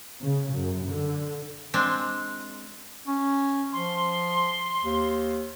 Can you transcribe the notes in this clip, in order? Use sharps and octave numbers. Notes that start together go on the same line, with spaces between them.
C#3
F#2
D3
G#3 C4 D4
C#4
F3 C6
D#2